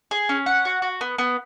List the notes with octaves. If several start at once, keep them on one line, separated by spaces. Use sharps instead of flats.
G#4
C#4
F#5
F#4
F#4
B3
B3